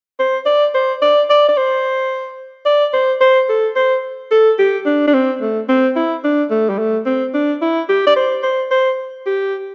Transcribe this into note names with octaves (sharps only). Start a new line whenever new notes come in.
C5
D5
C5
D5
D5
D5
C5
D5
C5
C5
A4
C5
A4
G4
D4
D4
C4
A3
C4
E4
D4
A3
G3
A3
C4
D4
E4
G4
D5
C5
C5
C5
G4